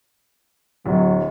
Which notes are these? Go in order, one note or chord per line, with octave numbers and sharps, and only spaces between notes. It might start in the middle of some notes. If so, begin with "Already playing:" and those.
D1 F#3